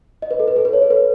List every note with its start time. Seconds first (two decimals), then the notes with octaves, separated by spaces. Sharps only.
0.22 D#5
0.31 B4
0.40 A4
0.47 B4
0.56 A4
0.65 B4
0.73 C#5
0.82 A4
0.90 B4